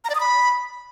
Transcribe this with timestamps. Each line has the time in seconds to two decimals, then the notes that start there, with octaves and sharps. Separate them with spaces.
0.05 A#5
0.10 D5
0.15 D#6
0.20 B5